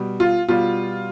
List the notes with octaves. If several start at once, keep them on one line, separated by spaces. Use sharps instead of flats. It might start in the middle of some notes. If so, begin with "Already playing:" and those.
Already playing: B2 G3
F4
B2 G3 F4